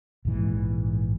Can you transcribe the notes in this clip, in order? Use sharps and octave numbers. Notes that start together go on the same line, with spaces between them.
A#1 G#2 E3